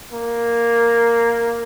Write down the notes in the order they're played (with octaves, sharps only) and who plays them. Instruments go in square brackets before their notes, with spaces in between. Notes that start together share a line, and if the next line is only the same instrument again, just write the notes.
[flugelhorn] A#3